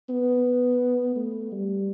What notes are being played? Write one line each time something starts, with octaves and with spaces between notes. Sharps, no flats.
B3
A3
G3